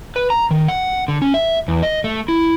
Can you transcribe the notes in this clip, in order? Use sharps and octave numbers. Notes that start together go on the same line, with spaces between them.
B4
A#5
D#3
F#5
D3
C#4
E5
E2
D#5
A3
E4